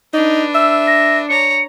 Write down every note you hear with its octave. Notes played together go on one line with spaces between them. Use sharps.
D4 D#4 B4
E5 E6
A#6
C#5 A#5 C#7